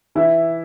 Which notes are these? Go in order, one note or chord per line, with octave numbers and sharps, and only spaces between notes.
E3 E4